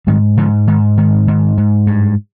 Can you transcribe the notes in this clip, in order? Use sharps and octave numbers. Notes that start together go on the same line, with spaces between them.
G#2 D#3 G3
G#2 D3 F3
G#2 D#3
G#2 D#3
G#2
G#2
G2